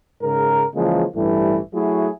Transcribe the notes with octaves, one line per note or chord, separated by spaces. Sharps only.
G#2 C#3 A#4
C#3 E3 F3 G#3 A#3
A1 G2 E3 G3 A3
F#3 A3 E4 F#4 G#4